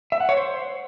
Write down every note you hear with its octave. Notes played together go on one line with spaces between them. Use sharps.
E5
F#5
C#5
C5